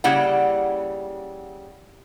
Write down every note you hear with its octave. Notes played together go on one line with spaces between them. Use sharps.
C#3 G3 A#3 E4 F#5